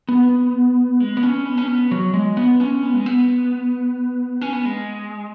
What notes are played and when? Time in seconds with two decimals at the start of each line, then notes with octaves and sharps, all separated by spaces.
0.09 B3
1.00 G#3
1.17 B3
1.23 C#4
1.45 B3
1.58 C#4
1.68 B3
1.91 F#3
2.14 G#3
2.37 B3
2.60 C#4
2.83 B3
2.94 G#3
3.06 B3
4.41 C#4
4.53 B3
4.65 G#3